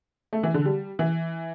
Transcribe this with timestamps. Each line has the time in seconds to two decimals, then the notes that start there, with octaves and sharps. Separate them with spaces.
0.33 A3
0.43 E3
0.54 D3
0.66 G3
0.99 E3